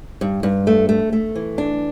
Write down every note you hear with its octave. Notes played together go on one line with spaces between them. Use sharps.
G2
G2
A3
A3
A3
E3
D4